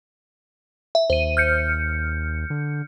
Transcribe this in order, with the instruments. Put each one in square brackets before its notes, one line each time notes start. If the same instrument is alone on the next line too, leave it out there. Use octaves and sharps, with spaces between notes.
[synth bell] E5
[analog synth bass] D#2 [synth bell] C5 D#7
[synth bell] F6 G6 C#7
[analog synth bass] D3